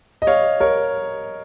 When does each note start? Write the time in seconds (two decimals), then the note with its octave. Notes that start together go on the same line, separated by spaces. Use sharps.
0.22 D#5
0.27 C#5 F5
0.60 A#4 C#5